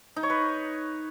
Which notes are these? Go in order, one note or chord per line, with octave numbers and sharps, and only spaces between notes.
D#4
C#5
B4